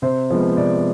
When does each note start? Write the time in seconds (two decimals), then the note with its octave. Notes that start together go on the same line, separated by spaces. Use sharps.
0.02 C3 C5
0.30 F3 G#3 B3
0.57 C3 D5